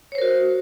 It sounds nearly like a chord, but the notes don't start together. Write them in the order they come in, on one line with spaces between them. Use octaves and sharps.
C#5 C5 A#4 F#4